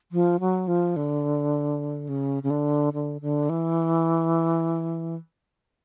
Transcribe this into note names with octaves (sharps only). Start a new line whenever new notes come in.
F3
F#3
F3
D3
C#3
C#3
D3
D3
D3
E3